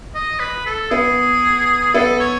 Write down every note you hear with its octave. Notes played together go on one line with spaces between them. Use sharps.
D#5
B4
A4
B3 G#4
B3 A4
C#5